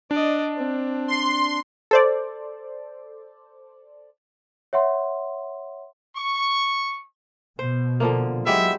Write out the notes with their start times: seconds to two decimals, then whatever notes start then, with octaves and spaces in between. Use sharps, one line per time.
0.11 D4 D5 D#5
0.57 C4
1.08 C6
1.91 A4 C5 D5
4.73 C#5 E5 F#5 C6
6.15 C#6
7.59 B2 C5
8.00 D3 F3 A#3
8.47 F#3 G#3 B3 E4 G4 E5